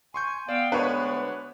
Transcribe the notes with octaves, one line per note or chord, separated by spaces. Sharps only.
G#5 C6 C#6 G6
B3 D5 F5 G5 E6
D2 G#3 D4 B4 C#5 C#6 D#7